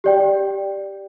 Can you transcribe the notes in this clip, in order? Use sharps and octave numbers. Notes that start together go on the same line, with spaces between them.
G4 D5 G5